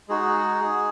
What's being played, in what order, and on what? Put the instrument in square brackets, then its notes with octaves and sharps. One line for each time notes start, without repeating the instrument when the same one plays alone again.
[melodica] G#3 D#4 F#4 G#4